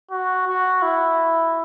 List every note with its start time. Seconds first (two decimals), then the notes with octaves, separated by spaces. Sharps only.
0.11 F#4
0.48 F#4
0.82 E4